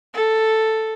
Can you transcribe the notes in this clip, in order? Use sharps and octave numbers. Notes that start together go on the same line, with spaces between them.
A4